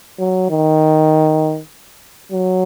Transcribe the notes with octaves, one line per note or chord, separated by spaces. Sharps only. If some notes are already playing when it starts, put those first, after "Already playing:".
F#3
D#3
F#3